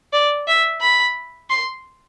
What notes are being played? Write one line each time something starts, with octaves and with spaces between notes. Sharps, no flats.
D5
E5
B5
C6